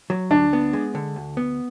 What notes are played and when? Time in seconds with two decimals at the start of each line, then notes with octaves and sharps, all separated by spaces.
0.10 F#3
0.31 D2 D4
0.53 B3
0.73 G#3
0.95 D3
1.16 D2
1.37 B3